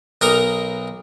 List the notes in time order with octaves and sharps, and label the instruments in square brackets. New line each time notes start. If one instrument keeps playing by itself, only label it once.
[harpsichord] B1 D#4 A#4